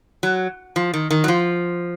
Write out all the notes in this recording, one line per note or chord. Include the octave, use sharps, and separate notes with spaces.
F#3
F3
D#3
D#3
F#3
F3